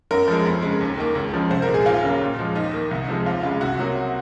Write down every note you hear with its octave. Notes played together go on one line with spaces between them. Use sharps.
F#2 A#4
F3 G#3
F2
C#3 G#3
D#2
D#3 A#3
C#2
C#3 F3 G#3
C2 C5
A#4
A#2 G#3
G#4
D#2 F4
C#3 F#3 A#3
A#2
F3 G#3
D#2 D#4
D#3 A#3
C2
C3 F3 G#3
D#2 F4
C#3 G#3 F4
C2 F#4
C3 F#3 A#3